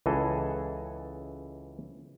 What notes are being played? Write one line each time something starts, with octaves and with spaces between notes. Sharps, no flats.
C#2 E3 G#4 A4 D#5 A5